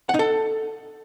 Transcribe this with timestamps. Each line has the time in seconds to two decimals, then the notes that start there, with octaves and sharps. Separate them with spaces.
0.09 F#5
0.14 D#4
0.19 A4